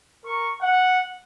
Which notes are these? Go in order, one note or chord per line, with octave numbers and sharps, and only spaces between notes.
A#4 C#6
F#5